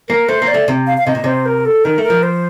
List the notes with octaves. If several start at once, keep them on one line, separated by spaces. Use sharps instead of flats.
A#3 A#4
A3 C5
A#3
D5
A3
C3
F5
F5
C3 D#5
A#2
C3 C5
A#4
A4
D#3 A#4
A3
A#4
F3
C5